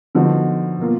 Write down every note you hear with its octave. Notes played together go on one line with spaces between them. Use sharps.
D3 F3 B3 D#4 F#4
B2 A#3 F4